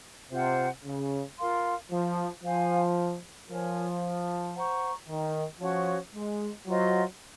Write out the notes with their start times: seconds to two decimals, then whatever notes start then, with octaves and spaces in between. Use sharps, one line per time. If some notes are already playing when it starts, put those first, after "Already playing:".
0.31 C3 F4 C5 F#5
0.84 C#3
1.38 F4 A#4 F5 C6
1.90 F3
2.43 F3 C5 F5 G#5
3.49 F3 A#4 C#5 G#5
4.55 C5 F#5 A#5 C#6
5.08 D#3
5.60 F3 C#4 F#4 C#5 F#5
6.13 G#3
6.66 F#3 F4 C5 D#5